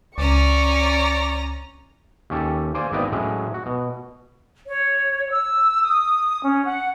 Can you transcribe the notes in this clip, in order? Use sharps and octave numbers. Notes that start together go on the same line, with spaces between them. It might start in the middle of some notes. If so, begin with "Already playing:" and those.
C#2 C#4 D5 A#5 C#6
D#2 C#4 G4 A4
A#3 C5 D5 G#5
G#1 A#3 B3 D4 D#5 G5
A2 F#3 G#3 C#4
F#4
B2
C#5
E6
D#6
C#4
F#5